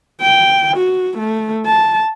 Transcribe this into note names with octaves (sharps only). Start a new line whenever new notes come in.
G5
F#4
A3
A5